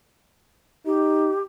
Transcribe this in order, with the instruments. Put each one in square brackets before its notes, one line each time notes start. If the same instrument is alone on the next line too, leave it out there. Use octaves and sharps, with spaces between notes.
[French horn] D#4 [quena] G4